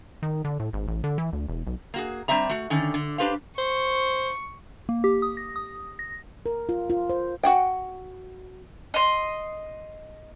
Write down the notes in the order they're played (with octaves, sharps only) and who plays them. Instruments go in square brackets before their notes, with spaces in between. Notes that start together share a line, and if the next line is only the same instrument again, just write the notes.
[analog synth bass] D#3
D3
A2
G#1
A1
D3
E3
D2
E1
B1
[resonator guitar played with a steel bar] A#3 F#4 G#4
G3 C4 D4 E5 A#5
A3 F#4
D3 D#3 C#4
D3
D4 G4 B4 C5 F5
[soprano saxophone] C5 [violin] C#6
[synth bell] A#3
G4
D#6
A#6
D#6
A#6
[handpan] A#4
F4
F4
C5
[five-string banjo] F#4 F#5 G5
[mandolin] D#5 C6